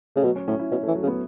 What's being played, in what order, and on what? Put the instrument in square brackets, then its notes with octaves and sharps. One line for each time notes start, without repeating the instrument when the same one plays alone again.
[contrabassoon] C#3 [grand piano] A3
[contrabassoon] B2 [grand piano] F#3
[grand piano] C#4
[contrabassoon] A2 [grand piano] C#4
[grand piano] E4
[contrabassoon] B2 [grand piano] C#4
[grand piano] A3
[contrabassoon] E3
[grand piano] F#3
[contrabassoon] C#3
[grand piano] B3